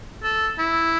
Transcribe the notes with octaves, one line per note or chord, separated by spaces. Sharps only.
A4
E4